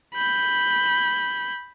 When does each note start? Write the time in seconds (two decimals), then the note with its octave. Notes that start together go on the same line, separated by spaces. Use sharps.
0.15 B5 G6